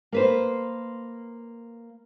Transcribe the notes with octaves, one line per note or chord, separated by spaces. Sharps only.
A#3 B4 C5